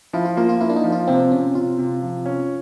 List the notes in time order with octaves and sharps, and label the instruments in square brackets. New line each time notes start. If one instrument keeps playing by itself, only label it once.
[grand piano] F3 [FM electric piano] E4
[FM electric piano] F4
[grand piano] A#3 [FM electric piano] F4
[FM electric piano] F4
[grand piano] A#3 [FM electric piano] E4
[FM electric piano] D4
D#4
[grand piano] F3
[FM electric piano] F4
[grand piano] C3 [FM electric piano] C4
[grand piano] C3 [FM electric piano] C#4
[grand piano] C3 [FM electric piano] F4
[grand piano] C3
F3
C#4